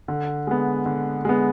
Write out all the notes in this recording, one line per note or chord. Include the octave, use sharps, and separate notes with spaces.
D3
G#3 B3
D3
G#3 B3